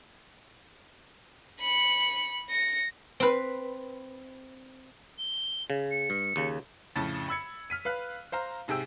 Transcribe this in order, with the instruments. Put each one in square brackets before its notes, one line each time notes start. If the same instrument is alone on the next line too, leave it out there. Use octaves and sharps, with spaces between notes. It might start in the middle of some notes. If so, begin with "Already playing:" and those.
[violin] B5 C#7
A#6 C#7
[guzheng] C4 B4
[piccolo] G7
[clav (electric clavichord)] C#3
[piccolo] C#7
[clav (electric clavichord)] G2
D#2 C#3
[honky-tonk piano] F2 A2 C#3 A5 A6
B5 E6 G#6 C#7
F6 B6 D#7
B4 F5 F#6
C5 F5 A#5
G#2 C3 G#4 G5 E6